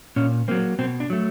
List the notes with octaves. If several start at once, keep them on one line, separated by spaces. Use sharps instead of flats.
A#2 C#4
F#3 A#3 C4
B2 C4
D4
F#3 A3